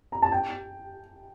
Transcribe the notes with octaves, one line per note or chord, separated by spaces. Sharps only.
A#5
A5
G5